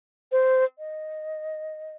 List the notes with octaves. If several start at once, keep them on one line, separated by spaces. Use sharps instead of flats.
C5
D#5